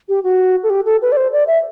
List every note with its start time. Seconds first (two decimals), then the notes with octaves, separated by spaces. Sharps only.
0.09 G4
0.23 F#4
0.63 A4
0.70 G4
0.86 A4
1.02 B4
1.12 D5
1.17 C5
1.33 D5
1.47 E5